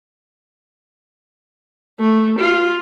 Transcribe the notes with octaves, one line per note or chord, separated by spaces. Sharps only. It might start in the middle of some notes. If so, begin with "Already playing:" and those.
A3
F4